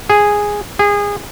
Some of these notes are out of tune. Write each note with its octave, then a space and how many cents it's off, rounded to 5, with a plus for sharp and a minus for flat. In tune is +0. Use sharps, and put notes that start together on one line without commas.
G#4 -5
G#4 -25